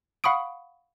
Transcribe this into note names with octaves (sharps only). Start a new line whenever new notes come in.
F5 F#5 B5 C#6 D#6 D7